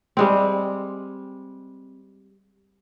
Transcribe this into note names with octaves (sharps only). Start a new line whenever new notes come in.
G3 G#3 C4